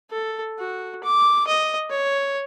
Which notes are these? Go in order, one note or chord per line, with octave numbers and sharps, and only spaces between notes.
A4
F#4
D6
D#5
C#5